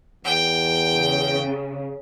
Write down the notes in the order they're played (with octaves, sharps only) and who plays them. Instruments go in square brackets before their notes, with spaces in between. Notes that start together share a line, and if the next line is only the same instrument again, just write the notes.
[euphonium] E2 [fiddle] G5
[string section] C#3